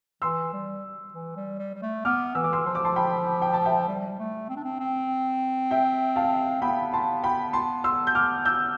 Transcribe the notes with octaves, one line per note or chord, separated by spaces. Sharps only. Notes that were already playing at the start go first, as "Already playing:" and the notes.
E3 C6 E6
G3
E3
G3
G3
G3
A3
B3 D6 F6
E3 E6
D6
C6 E6
F3 C6
D6
A5 C6
G5 B5
G5
A5
E5 G5
G3
G3
A3
C4
D4
C4
C4
E5 G5
F5 A5
B3 G5 B5
A5 C6
G5 B5
A5 C6
C6 E6
G6
D6 F6
E6 G6